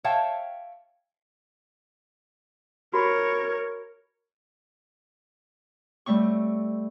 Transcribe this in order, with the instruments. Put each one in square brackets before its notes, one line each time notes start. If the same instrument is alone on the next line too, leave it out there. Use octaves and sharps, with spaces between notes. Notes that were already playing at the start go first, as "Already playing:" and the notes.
[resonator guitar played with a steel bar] C#5 E5 F5 G5 A5
[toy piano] F#4 B5 C#6 [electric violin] A#4 C#5
[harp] G3 A3 C4 C#6